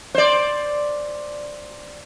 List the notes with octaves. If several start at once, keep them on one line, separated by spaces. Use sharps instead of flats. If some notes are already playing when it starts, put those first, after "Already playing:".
C5 D5